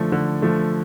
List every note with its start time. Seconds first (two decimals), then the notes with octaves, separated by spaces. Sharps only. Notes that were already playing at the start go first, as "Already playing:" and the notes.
Already playing: D3 F3 A3
0.12 D3
0.42 F3 A3